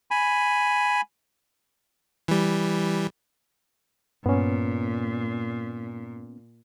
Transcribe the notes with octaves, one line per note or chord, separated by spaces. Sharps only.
G#5 B5
E3 G3
G2 A#2 B3 C#4